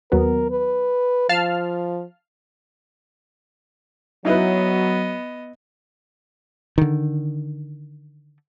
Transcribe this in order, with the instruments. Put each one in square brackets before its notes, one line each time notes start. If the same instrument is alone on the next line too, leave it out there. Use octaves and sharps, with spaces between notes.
[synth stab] D#2 F#3 B3 [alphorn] A#4
[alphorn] B4
[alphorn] F3 [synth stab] F5 A5 F6
[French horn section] F#3 [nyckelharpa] B3 D#5 [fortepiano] D#4 E4 B4
[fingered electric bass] D3 D#3